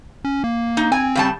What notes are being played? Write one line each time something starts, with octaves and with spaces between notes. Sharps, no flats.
C#4
A#3
D#4
C4 G#5
C#3 G3 A5